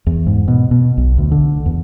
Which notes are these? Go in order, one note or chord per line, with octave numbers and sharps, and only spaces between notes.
E2
G#2
B2
B2
B1
D2
D3
E2